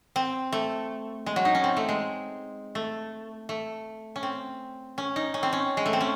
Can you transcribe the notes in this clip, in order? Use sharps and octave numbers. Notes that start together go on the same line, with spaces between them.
C4
A3
G#3
F#3
D#4
C#4
C4
A3
G#3
A3
A3
C#4
C4
C#4
D#4
C#4
C4
C#4
G#3
A3
C4
C#4